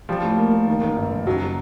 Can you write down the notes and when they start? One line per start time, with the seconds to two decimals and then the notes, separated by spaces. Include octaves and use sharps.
0.09 F3 G3
0.23 A2
0.37 A#3
0.53 A#3
0.67 D#3
0.82 D#3
0.96 G1
1.12 G2
1.26 F#1 F#3